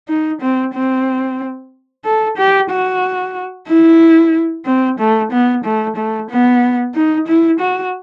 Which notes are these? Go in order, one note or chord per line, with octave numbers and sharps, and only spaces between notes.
D#4
C4
C4
A4
G4
F#4
E4
C4
A3
B3
A3
A3
B3
D#4
E4
F#4